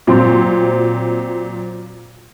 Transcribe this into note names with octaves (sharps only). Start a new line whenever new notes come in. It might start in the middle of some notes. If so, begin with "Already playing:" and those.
A#2 F#3 C4 C6